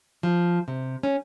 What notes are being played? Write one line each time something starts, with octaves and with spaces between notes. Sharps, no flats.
F3
C3
C#4